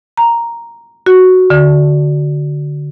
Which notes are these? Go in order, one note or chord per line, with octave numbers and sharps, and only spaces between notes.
A#5
F#4
D3